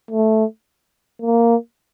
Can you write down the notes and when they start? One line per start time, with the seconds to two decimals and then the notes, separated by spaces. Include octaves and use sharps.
0.11 A3
1.22 A#3